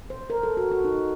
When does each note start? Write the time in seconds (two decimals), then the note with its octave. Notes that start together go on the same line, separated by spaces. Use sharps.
0.10 C5
0.30 A#4
0.43 A4
0.57 F#4
0.72 F#4
0.85 D#4